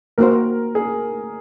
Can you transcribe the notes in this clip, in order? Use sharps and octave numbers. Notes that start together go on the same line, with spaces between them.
A#3 D#4 F#4 A#4 C5
G#4